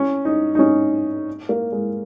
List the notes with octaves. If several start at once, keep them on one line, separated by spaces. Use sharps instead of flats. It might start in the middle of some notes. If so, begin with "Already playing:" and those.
Already playing: C#4
D#4
D#4
C#4
A#3
G#3